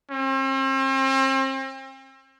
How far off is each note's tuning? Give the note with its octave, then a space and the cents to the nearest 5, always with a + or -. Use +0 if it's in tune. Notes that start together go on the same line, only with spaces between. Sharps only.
C4 +40